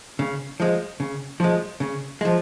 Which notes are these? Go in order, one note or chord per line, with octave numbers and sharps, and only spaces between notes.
C#3
F3 G#3
C#3
F3 G#3
C#3
F3 G#3